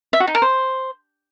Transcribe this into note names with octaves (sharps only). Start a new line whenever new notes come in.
E5
F#4
D#4
A#4
C5